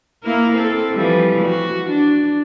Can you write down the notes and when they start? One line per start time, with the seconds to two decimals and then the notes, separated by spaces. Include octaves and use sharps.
0.24 A#3 E4 A#4
0.56 C4 A4
0.93 E3 F3 G3
1.45 F#4
1.90 D4